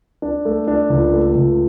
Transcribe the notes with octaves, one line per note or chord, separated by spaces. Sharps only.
D4
A3
D4
C#2
A3
C#2